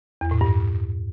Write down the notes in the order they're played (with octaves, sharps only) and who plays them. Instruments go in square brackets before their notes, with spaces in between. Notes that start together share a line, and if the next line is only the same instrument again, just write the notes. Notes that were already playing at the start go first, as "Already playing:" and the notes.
[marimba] E2
A2
G2